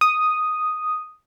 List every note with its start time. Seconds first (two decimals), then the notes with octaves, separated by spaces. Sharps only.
0.01 D#6